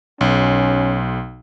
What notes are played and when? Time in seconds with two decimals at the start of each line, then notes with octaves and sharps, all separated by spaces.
0.21 B1 C#4